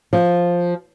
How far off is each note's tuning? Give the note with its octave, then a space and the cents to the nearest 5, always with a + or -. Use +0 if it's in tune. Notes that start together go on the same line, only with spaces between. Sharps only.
F3 +5